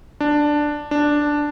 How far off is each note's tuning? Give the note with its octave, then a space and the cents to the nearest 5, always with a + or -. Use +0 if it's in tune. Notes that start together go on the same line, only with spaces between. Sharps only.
D4 +5
D4 +0